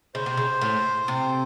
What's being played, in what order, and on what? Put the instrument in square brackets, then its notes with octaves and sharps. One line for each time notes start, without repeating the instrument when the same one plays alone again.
[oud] C#3 [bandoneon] C5
[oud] C3
C#3
A2
C3